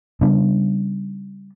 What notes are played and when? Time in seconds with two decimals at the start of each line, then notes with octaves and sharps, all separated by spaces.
0.21 C#3 G3 B3 D4